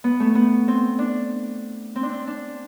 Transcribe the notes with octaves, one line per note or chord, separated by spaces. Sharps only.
B3
A3
B3
C4
D4
C4
D4
C4
D4